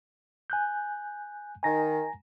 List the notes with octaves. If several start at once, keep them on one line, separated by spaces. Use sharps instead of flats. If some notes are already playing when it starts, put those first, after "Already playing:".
G#5 F#6 G6
D#3 G#5 A#5 A#6